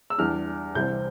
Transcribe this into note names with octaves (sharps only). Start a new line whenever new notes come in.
E6
E2 E3 G3 D4 F6
C2 C3 E3 G3 C4 G6